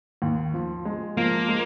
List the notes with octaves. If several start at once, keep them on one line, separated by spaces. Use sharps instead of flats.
D#2
F3
G#3
F3 A#3
G#3